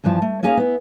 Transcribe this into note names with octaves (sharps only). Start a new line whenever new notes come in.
E2 G2 E3 F3 A5
A3
A#3 C#4 D#4 G#4 C#5 F5
B3 E4